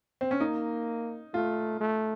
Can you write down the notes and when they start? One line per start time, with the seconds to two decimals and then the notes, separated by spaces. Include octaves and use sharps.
0.21 C4
0.31 C#4
0.40 A#3 D#4
1.34 A3 F4
1.80 A3